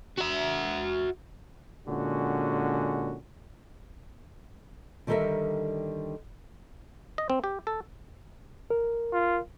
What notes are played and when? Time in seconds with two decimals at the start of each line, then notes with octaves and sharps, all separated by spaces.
0.18 F#4 E5
1.88 A#2 D3 G#3 C#4 F#4
5.07 D3 D#3 G3 A4 A#4 E5
7.18 D#5
7.30 C4
7.44 G4
7.67 A4
8.70 A#4
9.13 F4